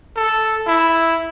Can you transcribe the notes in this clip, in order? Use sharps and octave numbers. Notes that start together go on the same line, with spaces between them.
A4
E4